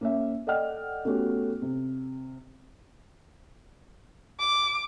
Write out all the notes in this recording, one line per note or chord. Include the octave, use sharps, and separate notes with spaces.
A#3 C#4 E5
A4 D5 D#5 F#5 G5 F6
A3 B3 C#4 F#4 G4
C3
D6